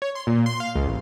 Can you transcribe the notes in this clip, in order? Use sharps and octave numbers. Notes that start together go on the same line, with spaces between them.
C#5
C6
A#2
C6
F5
C#2
A1